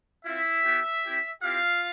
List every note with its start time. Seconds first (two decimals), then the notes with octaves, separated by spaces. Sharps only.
0.25 C4 E4 F4 E5
0.65 B3 E4 G4
1.04 C4 E4 G4
1.43 C4 E4 F4 G4 F5